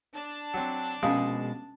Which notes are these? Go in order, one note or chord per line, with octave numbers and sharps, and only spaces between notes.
D4 A5
F#3 C4
A#1 B2 G#3 C#4 D#4 G#4 F5